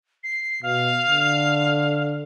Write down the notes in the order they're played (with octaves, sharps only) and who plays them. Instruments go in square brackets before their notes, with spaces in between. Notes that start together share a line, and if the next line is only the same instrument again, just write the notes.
[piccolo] C7
[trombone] B2 [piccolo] F5
[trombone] D3